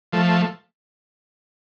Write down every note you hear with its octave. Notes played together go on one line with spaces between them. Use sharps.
F3 A3